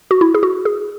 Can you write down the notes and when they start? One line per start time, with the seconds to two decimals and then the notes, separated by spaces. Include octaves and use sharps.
0.11 F#4
0.21 E4
0.34 G#4
0.43 F#4
0.65 G#4